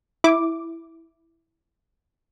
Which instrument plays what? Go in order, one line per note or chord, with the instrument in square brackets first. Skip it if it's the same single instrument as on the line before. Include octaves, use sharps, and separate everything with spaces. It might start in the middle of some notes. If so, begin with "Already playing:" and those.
[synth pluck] E4 D6